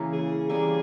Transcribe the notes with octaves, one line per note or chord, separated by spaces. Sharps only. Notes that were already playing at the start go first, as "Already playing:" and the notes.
Already playing: C#3 E3 A#3
G#4
C#3 E3 G3 A#3 G#4